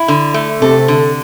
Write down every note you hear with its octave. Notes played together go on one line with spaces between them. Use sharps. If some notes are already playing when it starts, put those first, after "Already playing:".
Already playing: E4
D3
A3
C3 A4
D3